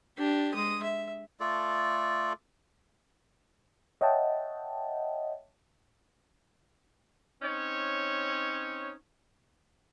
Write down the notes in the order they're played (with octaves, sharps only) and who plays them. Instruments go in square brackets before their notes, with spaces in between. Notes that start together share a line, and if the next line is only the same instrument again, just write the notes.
[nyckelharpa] D4 G4
G#3 D#6
E5
[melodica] A3 F4 A4 D5
[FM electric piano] C#5 D#5 E5 F#5 G5 A5
[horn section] C4 C#4 D#4 C#5